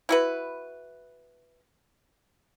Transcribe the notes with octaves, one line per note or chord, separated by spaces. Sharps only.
E4 F#4 B4